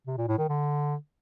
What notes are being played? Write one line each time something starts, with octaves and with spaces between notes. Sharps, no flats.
C3
A#2
A2
D#3
D3